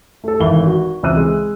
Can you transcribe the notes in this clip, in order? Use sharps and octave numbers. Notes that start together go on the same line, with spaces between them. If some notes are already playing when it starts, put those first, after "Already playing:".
A3 A4
G#1 E3 G7
F#4
C#2 E3 C4 E6 F#6 D#7
G#3